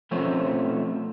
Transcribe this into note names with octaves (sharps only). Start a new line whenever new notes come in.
B2 F3 A3 C4 C#4